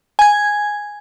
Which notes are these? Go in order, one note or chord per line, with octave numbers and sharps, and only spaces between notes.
G#5 G#6